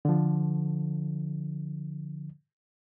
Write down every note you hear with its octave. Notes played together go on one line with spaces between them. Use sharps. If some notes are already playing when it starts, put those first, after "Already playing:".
D3 F3